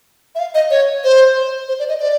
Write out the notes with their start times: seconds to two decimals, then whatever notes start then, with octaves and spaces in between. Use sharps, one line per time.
0.35 E5
0.39 F5
0.55 D#5
0.71 C#5
1.04 C5
1.68 C5
1.79 D5
1.89 D#5
2.00 D5